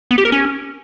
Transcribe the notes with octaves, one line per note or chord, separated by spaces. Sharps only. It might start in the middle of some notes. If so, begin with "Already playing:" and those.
B3
G4
A#4
C#4